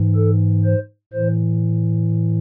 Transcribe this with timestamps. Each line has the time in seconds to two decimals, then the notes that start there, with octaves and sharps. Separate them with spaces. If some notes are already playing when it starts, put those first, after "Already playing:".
Already playing: G#2 E3
0.16 A4
0.64 C5
1.13 A2 E3 C5